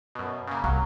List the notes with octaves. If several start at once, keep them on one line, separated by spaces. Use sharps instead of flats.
F#2 B2
C#3 A#3
C2 F#3